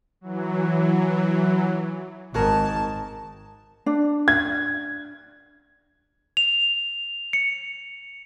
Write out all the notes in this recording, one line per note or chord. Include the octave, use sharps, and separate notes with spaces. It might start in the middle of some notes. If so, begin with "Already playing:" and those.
E3 F#3
G#1 D#3 F#4 G#4 A#4 A5
D4
G#6
F7
C#7